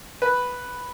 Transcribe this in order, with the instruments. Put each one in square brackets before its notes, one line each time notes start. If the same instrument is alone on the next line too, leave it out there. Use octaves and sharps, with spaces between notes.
[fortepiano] B4